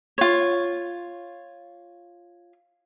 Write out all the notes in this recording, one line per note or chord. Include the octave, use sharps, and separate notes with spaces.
F4 C#5